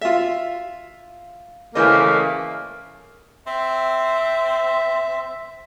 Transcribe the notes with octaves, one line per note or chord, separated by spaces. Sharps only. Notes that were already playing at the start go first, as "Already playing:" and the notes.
F4 E5
C#3 E3 A3 A#3 C5 D#5
C4 E5